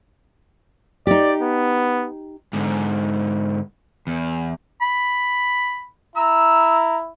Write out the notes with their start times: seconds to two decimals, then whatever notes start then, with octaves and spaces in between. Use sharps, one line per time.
1.07 D#4 G4 D5
1.42 B3
2.53 G#2 D3
4.07 E2
4.81 B5
6.16 E4 A#5 E6